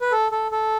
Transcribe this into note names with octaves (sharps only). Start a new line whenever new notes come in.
B4
A4
A4
A4